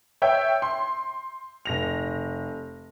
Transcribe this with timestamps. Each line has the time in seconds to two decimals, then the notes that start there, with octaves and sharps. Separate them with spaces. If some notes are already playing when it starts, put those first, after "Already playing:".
0.22 C#5 E5 G5
0.62 C6
1.65 F1 A#6 F7